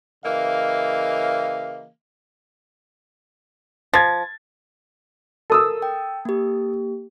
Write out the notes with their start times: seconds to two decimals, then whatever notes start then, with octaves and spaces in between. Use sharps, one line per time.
0.24 C#3 E3 A#3 D#5 F5
3.94 F3 G#6 A6
5.50 A4 A#4 D#6 E6
5.82 G5
6.25 A#3 G4